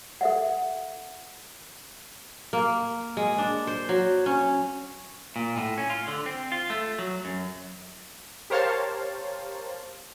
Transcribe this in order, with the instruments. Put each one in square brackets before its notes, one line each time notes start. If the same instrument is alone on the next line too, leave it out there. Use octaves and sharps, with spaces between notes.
[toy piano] A4 E5 F#5
[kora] A#3
G#3
D4
C5
F#3
C#4
[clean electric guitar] A#2
A2
C#4
F4
D3
C4
F4
A3
F#3
F#2
[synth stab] G4 A#4 C5 C#5 F5 A5